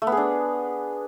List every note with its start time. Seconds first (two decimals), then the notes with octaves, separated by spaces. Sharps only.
0.02 A3
0.07 B3
0.12 G#4
0.17 D4